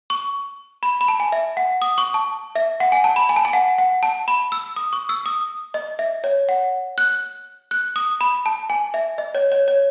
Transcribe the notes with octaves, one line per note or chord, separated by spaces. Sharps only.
C#6
B5
B5
A5
G#5
E5
F#5
D#6
C#6
A5
E5
F#5
G#5
A5
B5
G#5
A5
G#5
F#5
F#5
A5
B5
E6
D#6
C#6
E6
D#6
D#5
E5
C#5
F#5
F#6
F#6
D#6
B5
A5
G#5
E5
D#5
C#5
C#5
C#5